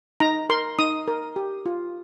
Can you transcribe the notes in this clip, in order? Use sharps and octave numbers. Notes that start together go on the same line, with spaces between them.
D#4 A#5
A#4 C6
D#4 D#6
A#4
G4
F4